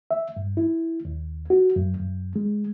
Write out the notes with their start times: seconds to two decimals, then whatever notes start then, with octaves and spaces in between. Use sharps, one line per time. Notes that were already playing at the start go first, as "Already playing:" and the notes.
0.11 E5
0.37 G2
0.57 E4
1.05 D#2
1.50 F#4
1.76 F#2
2.00 F#2
2.36 G#3